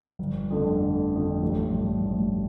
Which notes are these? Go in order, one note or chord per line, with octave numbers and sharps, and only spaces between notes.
G1
F2 D3 A3
G1
F2 D3 A3
A1
G2 F3
A1